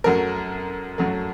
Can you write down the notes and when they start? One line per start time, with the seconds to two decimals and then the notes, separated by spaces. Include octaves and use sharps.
0.04 F#2 F#3 A3 A#4
0.98 F#2 F#3 A3